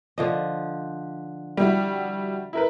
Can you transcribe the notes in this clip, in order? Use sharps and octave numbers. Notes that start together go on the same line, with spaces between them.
D3 F3 D#5
G3 E4 F#4
E4 A#4 B4